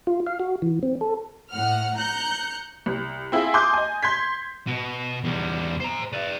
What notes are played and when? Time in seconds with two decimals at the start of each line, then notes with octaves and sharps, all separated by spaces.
0.07 F4
0.27 F5
0.40 F#4
0.62 E3
0.83 C4
1.01 A4
1.52 A2 F#5 F6
1.97 A#5 F#6 G6 C#7
2.86 C2
3.32 C4 E4 F4 G#4
3.54 G#5 C6 D6 D#6 G6
3.73 D#5 G#5
4.03 C6 G6 G#6 B6
4.67 B2
5.24 E2 G3
5.80 C5 A#5
6.12 B4 D5